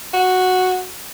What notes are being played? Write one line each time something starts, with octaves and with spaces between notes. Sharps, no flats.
F#4